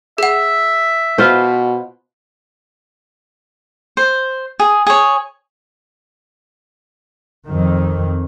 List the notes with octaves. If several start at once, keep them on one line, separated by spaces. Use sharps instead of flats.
G#4 E5 F#5
B2 F4 B4 C5
C5
G#4
G#4 C#5
F2 D#3